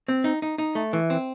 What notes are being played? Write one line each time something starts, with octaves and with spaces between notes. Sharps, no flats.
C4
D#4
D#4
D#4
A3
E3
C4